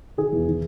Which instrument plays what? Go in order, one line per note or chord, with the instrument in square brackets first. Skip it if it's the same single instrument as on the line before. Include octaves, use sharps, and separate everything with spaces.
[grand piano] D#3 G#4
E2
D#3